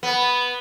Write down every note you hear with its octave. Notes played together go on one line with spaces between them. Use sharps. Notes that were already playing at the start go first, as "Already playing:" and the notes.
B3